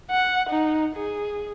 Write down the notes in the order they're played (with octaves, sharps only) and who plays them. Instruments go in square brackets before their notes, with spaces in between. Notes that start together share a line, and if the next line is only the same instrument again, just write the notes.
[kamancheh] F#5
D#4
G#4